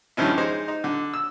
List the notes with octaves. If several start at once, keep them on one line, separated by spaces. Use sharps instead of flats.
G2 D#3 F3 C#4 E4
G#3 D#4 C5
D#4
D3
E6